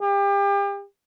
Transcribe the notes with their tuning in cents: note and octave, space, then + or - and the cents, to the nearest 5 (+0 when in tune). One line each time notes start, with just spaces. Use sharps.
G4 +35